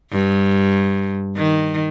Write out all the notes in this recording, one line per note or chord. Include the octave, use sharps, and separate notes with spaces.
G2
D#3